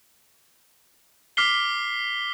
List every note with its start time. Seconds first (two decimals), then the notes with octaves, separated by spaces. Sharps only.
1.37 D6 F6 B6 C7 G7